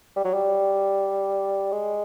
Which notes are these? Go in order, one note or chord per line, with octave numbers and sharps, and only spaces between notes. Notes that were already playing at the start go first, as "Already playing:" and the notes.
G3
F#3
G3
G#3